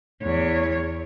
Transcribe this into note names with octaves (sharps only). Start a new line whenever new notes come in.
E2 C#5